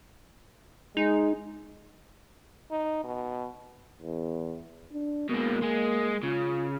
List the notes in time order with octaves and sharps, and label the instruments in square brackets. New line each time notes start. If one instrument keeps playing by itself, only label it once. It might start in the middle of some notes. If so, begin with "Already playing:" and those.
[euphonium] G#3 [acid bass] D#4
[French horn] D#4
B2
[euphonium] E2
D4
[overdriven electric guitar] B2 G#3 [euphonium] A#3
[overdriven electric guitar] G#3 G#4
[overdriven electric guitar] C#3 [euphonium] F4